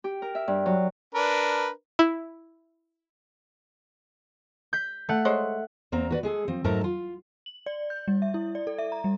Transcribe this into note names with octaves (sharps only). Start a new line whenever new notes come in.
G4
A#4
E5
G2
F#3
D4 A#4 B4
E4
G6 B6
A3 F#5
G#3 C5 C#5
E2 A#3 C4 A#5
F#4 B4 D5
G#3 G#4 A4
F3 C4
G#2 F#3 A3 A#4 A5 A#5
F4
F#7
D5
G6
G3
E5
E4
D5
A4
E5
A#5
G3